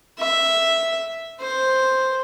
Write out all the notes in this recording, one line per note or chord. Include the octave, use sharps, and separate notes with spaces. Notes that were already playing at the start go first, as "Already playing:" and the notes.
E5
C5